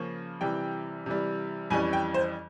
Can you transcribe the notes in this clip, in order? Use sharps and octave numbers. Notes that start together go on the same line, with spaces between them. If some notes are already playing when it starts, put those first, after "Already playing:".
Already playing: C#3 F3 A#3 C#4
C3 E3 G3 G5
C3 E3 G3
F2 E3 G3 C#4 G#5
G5
C5